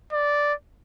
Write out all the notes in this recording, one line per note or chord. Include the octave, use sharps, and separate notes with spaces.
D5